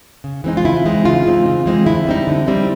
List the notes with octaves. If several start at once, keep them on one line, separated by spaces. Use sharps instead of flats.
C#3
E3 G#3 C4 D#4
F4
C#3 E4
E3 G#3 C4 D#4
C#3 F4
E3 G#3 C4 D#4
C#3
E3 G#3 C4 D#4
D3 E4
G3 C4 D#4
D3
G3 C4 D#4